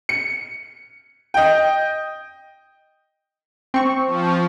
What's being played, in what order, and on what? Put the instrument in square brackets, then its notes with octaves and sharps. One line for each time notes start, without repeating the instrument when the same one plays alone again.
[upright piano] C#7
D#5 G5
[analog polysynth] C4 C#6
[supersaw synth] F3